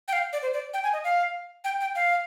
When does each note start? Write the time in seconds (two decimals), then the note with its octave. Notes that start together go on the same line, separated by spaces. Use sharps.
0.08 G5
0.13 F5
0.33 D5
0.42 C5
0.54 D5
0.74 G5
0.83 G#5
0.93 D#5
1.04 F5
1.64 G5
1.81 G5
1.96 F5